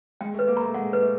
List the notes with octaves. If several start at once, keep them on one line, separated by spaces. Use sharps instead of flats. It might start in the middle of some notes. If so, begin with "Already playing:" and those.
G#3 G5
A3
B4
A#3
A3 A#5
G#3 F#5
B4
A3